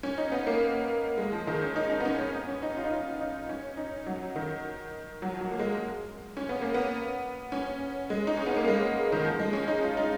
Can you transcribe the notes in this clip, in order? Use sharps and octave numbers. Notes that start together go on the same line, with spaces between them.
C#4
D#4
B3
A#3
G#3
F3
D#3
C#4
D#4
D#4
B3
C#4
C#4
B3
C#4
D#4
F4
D#4
F4
D#4
C#4
D#4
F#3
D#3
F#3
F3
F#3
A#3
G#3
C#4
B3
A#3
B3
C#4
G#3
D#4
C#4
B3
A#3
G#3
D#3
F3
G#3
C#4
D#4
F4
D#4